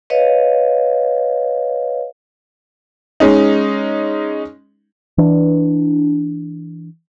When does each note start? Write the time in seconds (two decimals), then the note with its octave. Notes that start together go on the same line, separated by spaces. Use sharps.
0.10 B4 C#5 D#5 F5
3.20 G#3 C#4 D#4
5.18 E3 D4